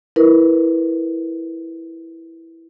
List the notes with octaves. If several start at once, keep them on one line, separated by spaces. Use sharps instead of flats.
E4 A#4 B4